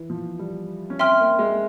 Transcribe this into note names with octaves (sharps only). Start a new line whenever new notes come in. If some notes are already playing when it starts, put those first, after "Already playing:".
Already playing: E3
F3
G3
C#4
C4 E5 G5 C6 F6
A#3
G#3